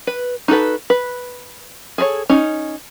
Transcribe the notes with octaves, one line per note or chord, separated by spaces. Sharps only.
B4
D#4 F#4 A4 B4
B4
G#4 A4 C5 C#5
C#4 D#4